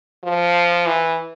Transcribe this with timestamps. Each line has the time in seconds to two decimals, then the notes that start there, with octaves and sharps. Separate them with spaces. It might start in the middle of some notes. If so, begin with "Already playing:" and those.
0.24 F3
0.86 E3